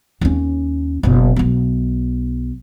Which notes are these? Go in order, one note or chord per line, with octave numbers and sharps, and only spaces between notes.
D#2 C#4
F#1 B2
B1 B3